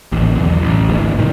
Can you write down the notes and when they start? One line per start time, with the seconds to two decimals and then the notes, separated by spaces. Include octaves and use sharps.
0.12 A1 D#2
0.35 B1 E2
0.62 A1
0.89 G#1 D2 G#2 E3
1.18 F#2 A#2 D#3 G3